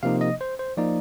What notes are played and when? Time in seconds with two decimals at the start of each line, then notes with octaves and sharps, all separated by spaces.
0.03 C3 F3 A#3 D#4 F5
0.21 D#5
0.41 C5
0.59 C5
0.77 F3 A#3 D#4 D5